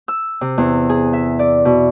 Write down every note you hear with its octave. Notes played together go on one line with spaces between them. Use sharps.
E6
C3
E2
G#4
E5
D5
B2